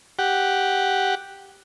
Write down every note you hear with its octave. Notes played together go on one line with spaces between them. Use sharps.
G4 F#5